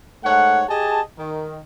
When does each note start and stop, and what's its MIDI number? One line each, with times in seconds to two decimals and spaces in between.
0.24 0.63 44
0.24 0.63 57
0.24 0.63 73
0.24 0.63 78
0.68 1.01 67
0.68 1.01 68
0.68 1.01 75
0.68 1.01 80
0.68 1.01 81
1.18 1.59 51